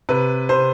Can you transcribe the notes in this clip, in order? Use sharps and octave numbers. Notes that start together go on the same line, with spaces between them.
C3 B4
C3 C5